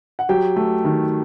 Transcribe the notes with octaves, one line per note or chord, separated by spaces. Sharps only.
F#5
F#3 G4 G5
A3
D#3